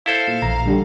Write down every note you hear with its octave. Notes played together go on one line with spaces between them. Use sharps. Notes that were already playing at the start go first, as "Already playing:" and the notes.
E4 A4 C5 F5
A#2
A#1 E3 A#5
G2 D3 G3